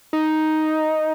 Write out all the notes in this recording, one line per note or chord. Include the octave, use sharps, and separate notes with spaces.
D#4